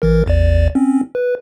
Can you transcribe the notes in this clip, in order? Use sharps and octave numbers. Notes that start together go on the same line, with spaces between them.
A1 E3 A#4
A1 E2 D5
C4 C#4
B4